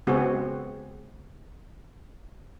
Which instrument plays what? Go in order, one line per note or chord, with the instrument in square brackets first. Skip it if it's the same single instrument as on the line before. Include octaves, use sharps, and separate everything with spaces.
[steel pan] C#3 G#3 B3 C4 F#4 G#4